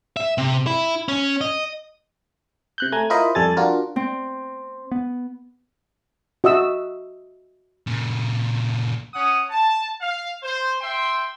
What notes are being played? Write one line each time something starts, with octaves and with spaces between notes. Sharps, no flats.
E5
C3
E4
C#4
D#5
C3 F#6 G6
A3 G#5 A#5 G#6
E4 F4 A#4 C5 D#5 B5
F2 G3 A4 G#5 A6
D4 F4 F#4 A#4
C4
B3
F#4 D#5 E5 E6
A#2 C#3
C#4 F#5 D#6
A5
F5
C5
E5 G5 C6